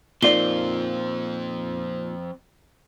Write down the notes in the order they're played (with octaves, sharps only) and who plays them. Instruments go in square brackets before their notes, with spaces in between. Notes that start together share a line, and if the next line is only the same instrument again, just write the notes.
[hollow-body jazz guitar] A#2 D#4 F4 [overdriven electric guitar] F3 C4 [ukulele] A#4 D5 [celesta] G7